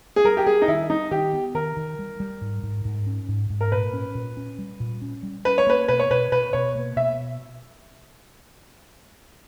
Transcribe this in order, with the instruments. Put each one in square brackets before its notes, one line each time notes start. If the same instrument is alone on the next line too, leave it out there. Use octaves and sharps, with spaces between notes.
[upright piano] G#4
[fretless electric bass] G3 [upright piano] A#4
[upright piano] G4
[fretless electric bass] G3 [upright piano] G#4
[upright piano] D#4
[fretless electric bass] D#3 [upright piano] E4
[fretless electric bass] G3 [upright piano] D#4
[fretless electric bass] D#3 [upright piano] G4
[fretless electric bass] B3
[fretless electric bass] D#3 [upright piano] A#4
[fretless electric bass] D#3
G3
G3
G#2
G#2
G#2
C#4
G#2
G#2
[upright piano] A#4
[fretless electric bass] A#2 [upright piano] B4
[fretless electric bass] C#4
A#2
C#4
G3
A#2
C#4
G3
[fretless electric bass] C#4 [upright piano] B4
[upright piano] C#5
[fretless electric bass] A#3 [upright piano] B4
[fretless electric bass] B2 [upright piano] B4
[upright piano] C#5
[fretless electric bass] B2 [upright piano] B4
[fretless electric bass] B2 [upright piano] B4
[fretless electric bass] B2 [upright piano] C#5
[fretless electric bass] A#3
[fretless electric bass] B2 [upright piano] E5